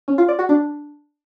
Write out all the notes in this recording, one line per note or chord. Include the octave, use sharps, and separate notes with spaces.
C#4
F4
D5
F#4
D4